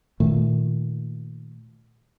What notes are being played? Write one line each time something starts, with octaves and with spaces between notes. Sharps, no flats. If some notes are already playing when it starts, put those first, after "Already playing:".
A#2 D#3 A3